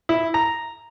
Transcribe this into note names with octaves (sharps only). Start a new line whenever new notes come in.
E4
A#5